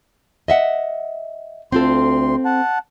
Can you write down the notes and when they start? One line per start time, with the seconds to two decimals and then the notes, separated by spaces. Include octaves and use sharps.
0.48 D#5 E5 F#5
1.72 D2 C4 F4 A4 C6
2.45 F#5 A5